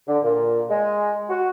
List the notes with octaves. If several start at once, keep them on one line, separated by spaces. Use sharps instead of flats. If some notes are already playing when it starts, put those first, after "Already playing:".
D3
A#2
G#3
F#4